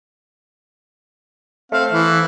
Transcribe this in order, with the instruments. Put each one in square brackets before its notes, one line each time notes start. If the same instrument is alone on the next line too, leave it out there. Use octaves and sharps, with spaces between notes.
[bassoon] A3 [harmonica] C4 F5
[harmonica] E3